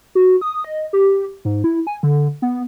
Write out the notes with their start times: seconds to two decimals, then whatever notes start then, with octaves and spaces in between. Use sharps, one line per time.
0.15 F#4
0.41 D#6
0.64 D#5
0.93 G4
1.45 G#2
1.64 E4
1.87 G#5
2.03 D3
2.42 B3